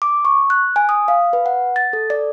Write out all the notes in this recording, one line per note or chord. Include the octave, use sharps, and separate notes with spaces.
D6
C#6
F#6
G#5
D#6
F5
B4
F#5
A6
A4
D5